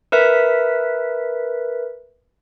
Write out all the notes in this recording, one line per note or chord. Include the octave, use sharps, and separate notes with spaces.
A#4 B4 E5 B6